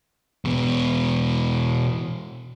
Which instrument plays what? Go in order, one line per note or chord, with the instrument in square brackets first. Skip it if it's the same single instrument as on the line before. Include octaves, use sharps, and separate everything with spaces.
[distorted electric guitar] E2 B2